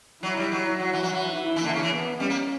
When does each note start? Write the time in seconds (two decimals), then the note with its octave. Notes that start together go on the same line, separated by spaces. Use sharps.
0.23 F#3 E4
0.37 G3
0.52 F#3
0.79 F#3 F#4
0.93 E3
1.03 F#3
1.13 E3
1.36 E4
1.56 E3
1.64 D3 A#3
1.73 C#3
1.83 E3
1.92 B3
2.20 G3 C#4
2.30 A#3